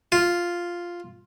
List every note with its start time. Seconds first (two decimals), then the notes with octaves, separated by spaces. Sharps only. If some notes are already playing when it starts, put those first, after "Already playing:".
0.12 F4